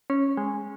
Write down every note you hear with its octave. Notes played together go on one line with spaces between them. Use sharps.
C#4
G#3